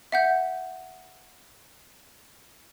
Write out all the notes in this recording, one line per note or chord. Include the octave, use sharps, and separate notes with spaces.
E5 F#5 G6